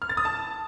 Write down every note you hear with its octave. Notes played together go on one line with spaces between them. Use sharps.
F6
A6
D#6
A5